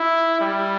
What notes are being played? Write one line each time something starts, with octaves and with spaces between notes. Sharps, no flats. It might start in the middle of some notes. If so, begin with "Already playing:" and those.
Already playing: E4
G3